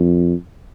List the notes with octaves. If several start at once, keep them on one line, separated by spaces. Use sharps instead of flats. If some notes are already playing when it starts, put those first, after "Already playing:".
Already playing: F2